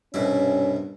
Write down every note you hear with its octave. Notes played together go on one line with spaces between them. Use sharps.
C2 G2 B2 C#4 E4